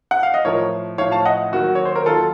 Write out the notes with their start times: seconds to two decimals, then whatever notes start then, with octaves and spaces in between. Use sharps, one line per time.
0.11 F#5
0.23 F5
0.34 D#5
0.45 A2 F3 A#4 C#5
0.98 A2 F3 C#5 F5
1.12 F5 A5
1.25 D#5 F#5
1.52 D#2 D#3 F#3 F#4
1.75 C#5
1.85 C5
1.96 A#4
2.05 D#2 D#3 F#3 F4 A4